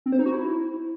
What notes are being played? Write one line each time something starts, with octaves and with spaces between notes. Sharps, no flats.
C4
C5
D#4
F#4
E4